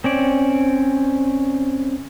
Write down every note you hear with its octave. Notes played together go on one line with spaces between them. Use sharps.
C4 C#4 D5